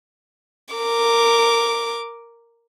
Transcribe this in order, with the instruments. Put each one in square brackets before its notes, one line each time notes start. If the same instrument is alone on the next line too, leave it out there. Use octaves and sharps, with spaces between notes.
[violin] A#4 D6